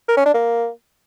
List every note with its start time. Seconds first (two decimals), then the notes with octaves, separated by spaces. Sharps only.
0.08 A#4
0.17 C#4
0.25 D4
0.34 A#3